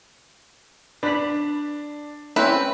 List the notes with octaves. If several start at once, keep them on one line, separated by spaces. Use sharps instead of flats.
D4 B4 B5
C4 C#4 E4 B4